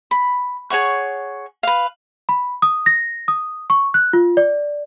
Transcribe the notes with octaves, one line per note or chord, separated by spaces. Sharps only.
B5
G#4 C#5 F#5 C#6
B4 F5
B5
D#6
A#6
D#6
C#6
F#6
F4
D5